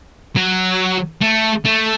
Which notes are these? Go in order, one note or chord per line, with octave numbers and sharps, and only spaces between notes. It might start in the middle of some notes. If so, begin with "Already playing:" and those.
F#3
A3
A3